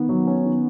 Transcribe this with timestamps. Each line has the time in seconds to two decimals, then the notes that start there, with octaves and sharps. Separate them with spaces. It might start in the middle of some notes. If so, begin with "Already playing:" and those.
Already playing: D#3 B3
0.09 F#3
0.27 C#4
0.45 D#3